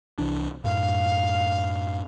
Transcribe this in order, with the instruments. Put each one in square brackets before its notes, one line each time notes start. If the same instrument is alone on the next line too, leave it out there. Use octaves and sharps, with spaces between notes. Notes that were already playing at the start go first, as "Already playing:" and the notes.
[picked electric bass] C2 E3 D4
[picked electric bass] F#2 A2 [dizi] F5